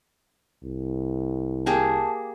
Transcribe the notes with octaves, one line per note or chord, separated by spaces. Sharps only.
C2
A#3 G4 G#4 A5